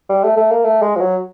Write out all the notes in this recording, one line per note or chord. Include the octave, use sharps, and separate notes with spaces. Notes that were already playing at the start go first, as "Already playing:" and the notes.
G3
A3
A3
A#3
A3
G#3
F3
F#3